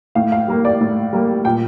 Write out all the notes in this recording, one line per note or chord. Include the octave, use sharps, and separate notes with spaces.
A2 F5
F5
G3 A#3
D5
A2
G3 A#3
A#2 G5